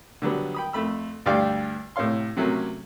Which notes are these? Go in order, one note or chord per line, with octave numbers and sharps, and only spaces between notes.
D3 F#3 G3 B3
G5 B5 D#6
F2 A3 B5 E6
D2 G2 G3 D5 F5 G5
A2 C3 C#5 F5 C6
C3 F#3 A3 A#3 C#4